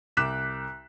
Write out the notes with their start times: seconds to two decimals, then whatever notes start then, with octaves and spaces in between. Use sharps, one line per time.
0.17 C2 D6 F#6 B6 E7